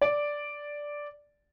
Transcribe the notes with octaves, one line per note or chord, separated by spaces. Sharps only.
D5